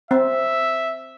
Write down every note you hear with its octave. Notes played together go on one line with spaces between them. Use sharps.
C4 E5